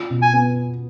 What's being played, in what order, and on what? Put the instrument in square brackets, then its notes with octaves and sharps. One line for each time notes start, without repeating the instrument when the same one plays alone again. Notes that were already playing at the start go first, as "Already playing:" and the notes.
Already playing: [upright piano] F4
B2
[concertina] G#5
[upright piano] B3